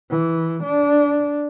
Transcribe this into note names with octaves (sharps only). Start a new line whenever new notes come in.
E3
D4